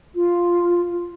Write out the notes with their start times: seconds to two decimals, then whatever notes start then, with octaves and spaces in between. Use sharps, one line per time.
0.15 F4